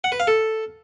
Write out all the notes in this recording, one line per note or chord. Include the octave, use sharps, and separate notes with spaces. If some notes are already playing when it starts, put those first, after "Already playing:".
F#5
B4
F5
A4